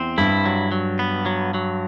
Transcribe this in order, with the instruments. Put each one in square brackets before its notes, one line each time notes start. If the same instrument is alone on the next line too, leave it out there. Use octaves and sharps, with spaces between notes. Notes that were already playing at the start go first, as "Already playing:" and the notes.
Already playing: [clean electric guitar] E2 C4
[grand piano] G2 [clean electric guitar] E4
[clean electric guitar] F#3
F#3
B3
F#3
F#3